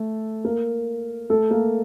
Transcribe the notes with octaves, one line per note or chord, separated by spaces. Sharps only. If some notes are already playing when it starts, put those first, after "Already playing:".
Already playing: A3 A4
A#3 A#4
A3 A4
A#3 A#4